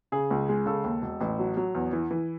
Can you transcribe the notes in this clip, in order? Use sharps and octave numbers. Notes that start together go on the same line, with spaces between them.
C#3 G#4
C#2
G#3
C#3 A4
D#2
E1
A1
F#3
F#3
E2
E3
E3